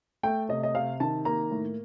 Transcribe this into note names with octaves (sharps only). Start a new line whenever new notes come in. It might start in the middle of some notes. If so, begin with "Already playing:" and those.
A3 G5
C3 D#5
D#5
C3 F5
D#3 A5
A#3 A#5
A2